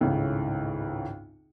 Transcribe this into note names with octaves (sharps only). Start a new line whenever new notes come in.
G#1 C#2 A2 C#3